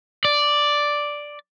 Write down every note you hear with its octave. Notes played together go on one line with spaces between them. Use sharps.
D5